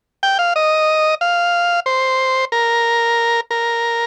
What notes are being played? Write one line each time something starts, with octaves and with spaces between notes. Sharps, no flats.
G5
F5
D#5
F5
C5
A#4
A#4